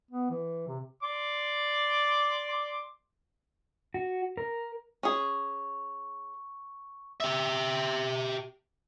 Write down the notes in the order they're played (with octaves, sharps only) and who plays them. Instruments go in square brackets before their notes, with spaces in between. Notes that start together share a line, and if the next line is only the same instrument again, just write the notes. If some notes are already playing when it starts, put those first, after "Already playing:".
[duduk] B3
E3
C3
[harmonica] D5 C6 D6
[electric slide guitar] F#4
A#4
[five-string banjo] C#4 G#4 [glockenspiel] C#6
[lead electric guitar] G4 E5